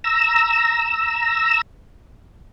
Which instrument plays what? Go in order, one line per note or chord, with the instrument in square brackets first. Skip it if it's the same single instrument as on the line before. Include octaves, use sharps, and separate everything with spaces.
[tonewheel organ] A#5 E6